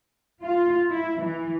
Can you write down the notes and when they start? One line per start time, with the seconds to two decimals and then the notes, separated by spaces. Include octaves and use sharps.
0.42 F4
0.90 E4
1.22 E3